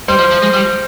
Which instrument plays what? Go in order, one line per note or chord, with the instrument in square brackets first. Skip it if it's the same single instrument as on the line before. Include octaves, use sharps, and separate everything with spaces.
[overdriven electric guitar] G3 [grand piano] C5
[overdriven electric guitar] F3
F3
G#3
G3